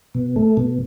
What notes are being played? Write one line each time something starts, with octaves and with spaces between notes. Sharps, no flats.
B2
A3
B2